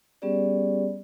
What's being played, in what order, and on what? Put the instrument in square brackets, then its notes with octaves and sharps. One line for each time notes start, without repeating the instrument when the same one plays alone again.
[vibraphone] G3 B3 C#4 G4 G#4 D5